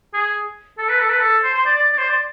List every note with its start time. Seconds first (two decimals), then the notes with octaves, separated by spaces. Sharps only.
0.14 G#4
0.78 A4
0.89 B4
1.00 A4
1.10 B4
1.20 A4
1.44 C5
1.55 C5
1.66 D5
1.76 D5
1.93 D5
1.98 C5
2.09 D5